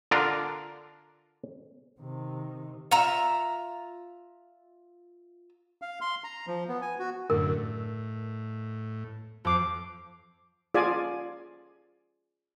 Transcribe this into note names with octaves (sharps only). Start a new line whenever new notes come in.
D3 D4 F4 A#4
C3 D#3
F4 E5 A#5
F5
C6
A#5
F3
B3
G#5
F#4
F#2 A2 D3 A#4
A2
F2 D6 C7
F4 G#4 D5 G#5